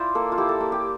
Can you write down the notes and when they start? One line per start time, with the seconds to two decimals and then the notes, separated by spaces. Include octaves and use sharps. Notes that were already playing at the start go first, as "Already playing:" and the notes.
Already playing: E4 F4 C5 D5
0.15 A#3 A4
0.32 F4
0.38 E4 G4
0.49 A4
0.60 A#3
0.72 G4